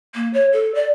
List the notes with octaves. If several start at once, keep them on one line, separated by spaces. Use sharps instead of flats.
A#3
C#5
A4
D5